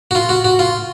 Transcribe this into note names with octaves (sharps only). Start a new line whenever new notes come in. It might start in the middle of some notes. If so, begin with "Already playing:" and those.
F#4
F4
F#4
F#4
F4